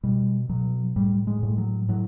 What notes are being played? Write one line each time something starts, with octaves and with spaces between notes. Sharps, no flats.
B2 G3
B2 F#3
A2 G3
G#3
A2
F#3
A2 F#3